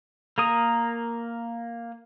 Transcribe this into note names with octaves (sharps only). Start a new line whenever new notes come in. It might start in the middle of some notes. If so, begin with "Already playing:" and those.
A#3 A#4 D#6